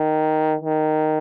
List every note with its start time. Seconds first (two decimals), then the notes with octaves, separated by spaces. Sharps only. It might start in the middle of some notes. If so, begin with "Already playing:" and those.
Already playing: D#3
0.62 D#3